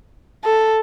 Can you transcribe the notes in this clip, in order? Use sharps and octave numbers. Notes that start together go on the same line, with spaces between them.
A4